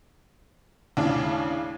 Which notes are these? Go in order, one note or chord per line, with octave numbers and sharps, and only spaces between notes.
D#2 A2 C#3 D4 D6